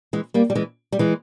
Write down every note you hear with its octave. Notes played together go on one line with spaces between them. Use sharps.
E3 G#3
G3 A#3
G3
E3 G#3
G3
E3 G#3